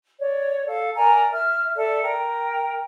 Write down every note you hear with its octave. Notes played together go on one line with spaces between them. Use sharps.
C#5 D5
A4 F5
A#4 D5 G#5 A#5
E5 F6
A4 D5 E5
A#4 G5